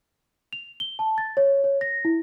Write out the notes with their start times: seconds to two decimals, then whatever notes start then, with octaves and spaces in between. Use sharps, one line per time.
0.53 F7
0.80 G7
0.99 A5
1.18 A6
1.37 C#5
1.64 C#5
1.81 A#6
2.05 E4